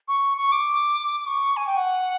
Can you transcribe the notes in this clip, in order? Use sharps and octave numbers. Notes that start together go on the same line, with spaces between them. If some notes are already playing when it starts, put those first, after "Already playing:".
C#6
C#6
D6
C#6
G#5
G5
F#5